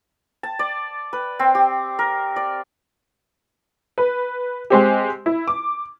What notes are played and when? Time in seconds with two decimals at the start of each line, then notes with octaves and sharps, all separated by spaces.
0.43 A5
0.59 D5
1.13 B4
1.39 C4
1.55 G4
1.99 A#4
2.36 D5
3.98 B4
4.70 G#3 C4 G4
5.26 E4
5.48 D6